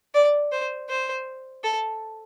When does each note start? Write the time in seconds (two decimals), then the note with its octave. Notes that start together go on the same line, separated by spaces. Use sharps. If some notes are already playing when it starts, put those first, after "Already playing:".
0.14 D5
0.52 C5
0.89 C5
1.64 A4